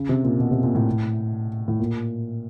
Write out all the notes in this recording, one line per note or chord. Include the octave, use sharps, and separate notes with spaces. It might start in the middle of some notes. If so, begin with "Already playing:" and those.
Already playing: C#3
C3
A#2
B2
C3
A#2
A2
A2
A#2